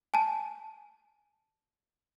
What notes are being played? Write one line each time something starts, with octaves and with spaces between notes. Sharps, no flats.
G#5 A5